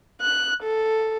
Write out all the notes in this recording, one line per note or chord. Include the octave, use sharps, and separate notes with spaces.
F#6
A4